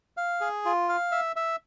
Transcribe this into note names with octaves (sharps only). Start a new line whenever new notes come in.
F5
G#4
F4
F5
E5
E5